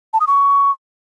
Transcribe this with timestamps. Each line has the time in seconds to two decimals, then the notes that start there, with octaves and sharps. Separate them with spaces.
0.13 A5
0.20 D#6
0.27 C#6